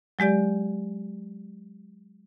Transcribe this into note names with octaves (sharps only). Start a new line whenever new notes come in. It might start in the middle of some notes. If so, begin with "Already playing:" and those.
F#3 G#3 G4 D5